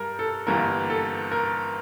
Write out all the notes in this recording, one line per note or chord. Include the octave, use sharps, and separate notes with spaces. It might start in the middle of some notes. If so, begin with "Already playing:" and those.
Already playing: G2 G3 A#4
A4
G1 G2 E3 A#3 A#4
A4
A#4